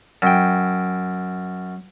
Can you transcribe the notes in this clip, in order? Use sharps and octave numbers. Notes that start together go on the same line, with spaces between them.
F#2 G5